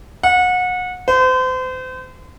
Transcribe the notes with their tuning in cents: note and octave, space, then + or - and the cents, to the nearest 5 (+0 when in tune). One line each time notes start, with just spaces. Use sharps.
F#5 -30
C5 -35